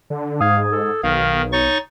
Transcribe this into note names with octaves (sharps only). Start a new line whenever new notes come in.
D3
G#2 F5 D#6 G#6
A4
B1 D#3 F5
D#4 C#5 C#6 A6